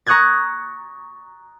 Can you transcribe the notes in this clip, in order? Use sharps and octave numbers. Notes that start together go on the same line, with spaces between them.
A#5 C#6 D#6 F#6 G#6 A6